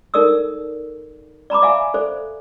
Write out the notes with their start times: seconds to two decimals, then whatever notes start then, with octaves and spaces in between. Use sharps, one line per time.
0.14 D#4 A4 A#4 D5 D#6 E6
1.50 D5 A#5 B5 D6
1.62 D5 E5 F5 G#5
1.94 A4 C5 D5